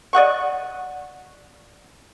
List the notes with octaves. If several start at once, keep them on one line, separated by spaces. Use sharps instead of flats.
D5 D#5 F#5 C#6